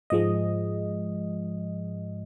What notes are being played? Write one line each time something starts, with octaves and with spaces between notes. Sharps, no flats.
G#2 F3 G#3 D#5